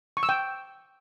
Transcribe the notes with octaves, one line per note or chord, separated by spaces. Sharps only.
C#6
E6
G5